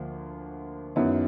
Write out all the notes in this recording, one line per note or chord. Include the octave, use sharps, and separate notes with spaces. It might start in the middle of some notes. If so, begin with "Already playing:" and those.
Already playing: D2 F3 A#3
F#2 D#3 F#3 B3 E4